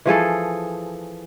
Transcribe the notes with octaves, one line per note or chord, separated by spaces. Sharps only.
E3 F3 G#4 A4